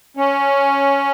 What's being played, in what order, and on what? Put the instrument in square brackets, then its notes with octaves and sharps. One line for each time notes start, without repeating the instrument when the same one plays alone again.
[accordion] C#4